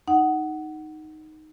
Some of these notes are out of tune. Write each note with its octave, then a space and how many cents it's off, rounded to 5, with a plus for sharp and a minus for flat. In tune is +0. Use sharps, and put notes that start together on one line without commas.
D#4 +0 F#5 +15